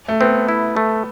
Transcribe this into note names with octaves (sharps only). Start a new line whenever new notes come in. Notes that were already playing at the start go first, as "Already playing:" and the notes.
A3
B3 C4
E4
A3